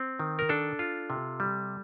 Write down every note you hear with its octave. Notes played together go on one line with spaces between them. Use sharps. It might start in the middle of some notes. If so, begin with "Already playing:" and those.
Already playing: C4
D#3
A#4
D4 A4
F4
C3
G3